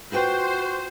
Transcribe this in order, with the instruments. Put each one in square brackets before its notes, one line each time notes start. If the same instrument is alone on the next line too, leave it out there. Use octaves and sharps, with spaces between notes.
[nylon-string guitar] F4 B4 G5 [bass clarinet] F#4 [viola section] C5